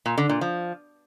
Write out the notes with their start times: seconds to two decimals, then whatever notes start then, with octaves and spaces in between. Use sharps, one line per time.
0.06 A#2
0.18 D3
0.29 A#2
0.41 F3